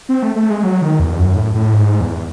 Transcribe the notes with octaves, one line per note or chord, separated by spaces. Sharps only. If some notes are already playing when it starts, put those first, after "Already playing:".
C4
A3
A3
G#3
F#3
D#3
E2
F#2
A2
A2
G#2
E2